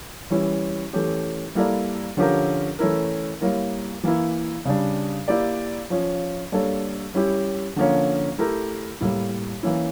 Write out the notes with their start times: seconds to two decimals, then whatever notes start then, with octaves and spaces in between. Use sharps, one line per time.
0.30 E3 G3 C#4 E4
0.93 E3 A3 C#4 G4
1.55 G3 A#3 E4 A4 D5
2.17 D3 F3 C#4 G4 A#4
2.79 E3 A3 C#4 E4 A#4
3.41 G3 A#3 E4 A#4 C#5
4.03 E3 A#3 E4
4.65 C#3 G3 D4
5.28 A#3 E4 G4 D5
5.90 F3 C#4 F4
6.52 G3 A#3 D4 A4 C#5
7.14 G3 C#4 E4 G4
7.76 D3 F3 A#3 C#4
8.38 A3 E4 G4 A#4
9.01 A2 G3 A#3 E4
9.63 E3 A#3 C#4 E4